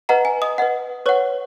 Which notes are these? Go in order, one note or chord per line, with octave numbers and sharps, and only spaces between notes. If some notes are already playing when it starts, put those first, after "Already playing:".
B4 D#5 F#5 A#5
G#5
D#5 D#6
B4 D#5 F#5
B4 C#5 F#5 C#6